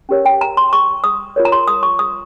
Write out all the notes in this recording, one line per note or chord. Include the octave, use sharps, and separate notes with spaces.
C#4 G4 A#4 C#5
G5
A#5
C6
C#6
D#6
F4 A#4 C#5
A#5
C6
D#6
C#6
D#6